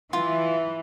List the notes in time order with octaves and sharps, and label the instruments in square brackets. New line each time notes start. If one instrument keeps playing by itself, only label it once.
[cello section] E3 [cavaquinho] F4